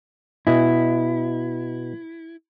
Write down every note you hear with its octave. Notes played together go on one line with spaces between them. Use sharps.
B2 E4 D#5 G#5